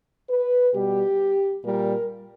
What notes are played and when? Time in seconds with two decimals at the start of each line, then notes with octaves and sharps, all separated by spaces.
0.29 B4
0.73 B2 G3 G4
1.63 A#2 G3 A#4